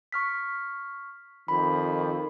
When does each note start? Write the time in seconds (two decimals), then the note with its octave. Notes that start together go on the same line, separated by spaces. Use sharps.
0.12 C#6 F6 B6
1.48 F2 D#3 B5